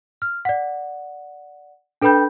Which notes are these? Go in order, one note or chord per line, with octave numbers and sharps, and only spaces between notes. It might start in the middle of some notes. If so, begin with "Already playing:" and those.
F6
D5 F#5
D4 A4 B4 G5 B5 G6